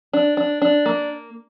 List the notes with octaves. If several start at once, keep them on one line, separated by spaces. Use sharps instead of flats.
D4
D4
D4
A#3